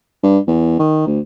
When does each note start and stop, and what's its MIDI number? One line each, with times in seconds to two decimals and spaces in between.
0.23 0.39 43
0.48 0.78 40
0.79 1.05 51
1.07 1.20 38